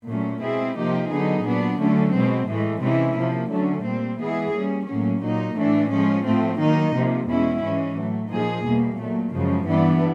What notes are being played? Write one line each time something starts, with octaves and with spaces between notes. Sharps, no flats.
A#2 F#3 A3 C#4
B2 G#3 C4 E4 G#4
C3 F3 A#3 D#4 G4
D3 F#3 B3 D#4 G#4
A#2 F#3 B3 D4
D3 F#3 A3 C#4
B2 G#3 C4
A2 E3 G#3
C3 E3 G#3 C#4 E4
C3 F3 A#3
D3 F#3 A3 C#4
A#2 G3 C4
E3 G#3 B3 E4 G#4
G3 A#3 C#4
A2 F#3 A#3 C#4
A#2 F#3 A#3 D#4
A2 E3 A3 D4
F3 G#3 C#4
A2 F3 A3 C4
D#3 F#3 A#3 D#4
C3 F3 A#3
E2 B2 G#3 C#4 E4
G#2 E3 G#3 C#4
A2 F#3 A3
A#2 F3 A#3 D#4 G#4
E2 B2 G3 A#3
A#2 F#3 A3
F#2 C#3 F3 G#3
G2 E3 G3 B3 D4